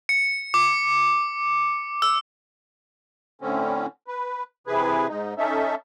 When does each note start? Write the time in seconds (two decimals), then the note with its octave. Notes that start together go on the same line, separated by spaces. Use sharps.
0.09 C#7
0.54 D6
2.02 E6
3.41 A2 D3 C4 C#4
4.07 B4
4.67 C3 E3 G#4 B4
5.08 G#2 D#4
5.38 C#4 D#4 A4 E5